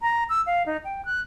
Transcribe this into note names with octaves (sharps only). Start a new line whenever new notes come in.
A#5
E6
F5
D#4
G5
F#6